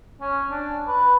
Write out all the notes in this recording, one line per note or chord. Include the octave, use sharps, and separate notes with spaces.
C#4
D4
B4